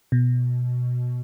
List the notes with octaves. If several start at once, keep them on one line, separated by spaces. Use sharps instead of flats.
B2